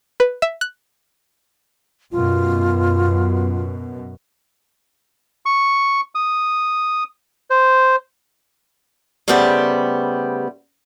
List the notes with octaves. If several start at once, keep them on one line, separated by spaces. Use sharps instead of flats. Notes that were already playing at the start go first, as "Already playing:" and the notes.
B4
E5
F#6
F#2 B2 F4
C#6
D#6
C5
C#3 G3 A3 B3 G4 C5